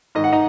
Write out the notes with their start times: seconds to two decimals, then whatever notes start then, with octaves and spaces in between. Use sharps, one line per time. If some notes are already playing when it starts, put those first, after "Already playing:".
0.15 G#2 D#3 D#5
0.24 F#5
0.33 D#4 D#5